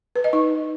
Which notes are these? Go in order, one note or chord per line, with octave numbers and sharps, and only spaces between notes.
B4
D#5
D#4